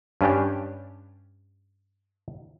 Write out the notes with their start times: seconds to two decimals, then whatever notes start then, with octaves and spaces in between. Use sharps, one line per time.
0.21 G2 C#4 D4 G4